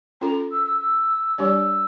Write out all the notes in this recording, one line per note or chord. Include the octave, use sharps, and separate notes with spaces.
C#4 F4 A4 A#5
E6
E6
E6
G3 D4 G4 D5 E6